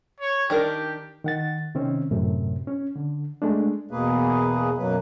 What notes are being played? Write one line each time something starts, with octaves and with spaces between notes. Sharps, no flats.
C#5
D#3 D4 G4 A#4
D#3 F#5 A6
C3 D#3 C4 C#4
F#2 A2 C3
C#4
D3
G#3 A3 D4
E2 B2 A#3 G#4 B4
F#2 B2 F#3 A#3 B4